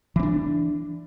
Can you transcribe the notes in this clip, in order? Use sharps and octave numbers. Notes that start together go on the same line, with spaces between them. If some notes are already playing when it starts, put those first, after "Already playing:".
E3 C4 D4